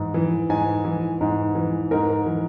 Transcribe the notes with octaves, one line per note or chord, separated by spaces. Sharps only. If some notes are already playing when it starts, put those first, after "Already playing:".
Already playing: G#2 E3
E3
G#2 G#5
E3
G#2
E3
G#2 A#4
E3